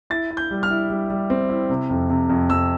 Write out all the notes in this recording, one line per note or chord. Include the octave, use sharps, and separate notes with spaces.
E4 A6
E4
G6
G3
F6
E4
G3
G3
C4
E4
C3
F2
C3
F2
F2 E6